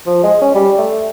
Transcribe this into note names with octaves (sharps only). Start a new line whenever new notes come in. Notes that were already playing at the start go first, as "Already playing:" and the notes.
F3
G#3
C#4
G3
A3